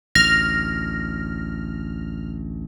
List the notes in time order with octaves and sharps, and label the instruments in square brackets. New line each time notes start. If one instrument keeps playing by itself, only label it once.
[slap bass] A1 D2 [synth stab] F6 [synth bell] A#6